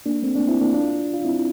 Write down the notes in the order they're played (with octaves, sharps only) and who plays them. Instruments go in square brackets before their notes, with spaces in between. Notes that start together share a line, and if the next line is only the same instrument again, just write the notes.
[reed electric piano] A#3 D4
A3 C4
A#3 D4
C4 E4
A#3 D4
D4 F4
F4
C4 E4